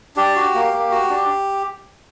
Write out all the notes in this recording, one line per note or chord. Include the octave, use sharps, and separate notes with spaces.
D4 G4
F#4
A#3
A#3
F#4
D4